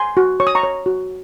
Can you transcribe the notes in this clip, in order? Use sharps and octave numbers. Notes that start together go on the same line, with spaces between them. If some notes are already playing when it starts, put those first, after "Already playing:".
Already playing: G#5 C6
F#4
C#5 C#6
D#6
A#5 C#6
C#5
F#4